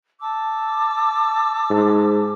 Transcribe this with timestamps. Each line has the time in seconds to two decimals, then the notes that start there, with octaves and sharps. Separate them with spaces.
0.20 A5 D6 E6
1.70 G#2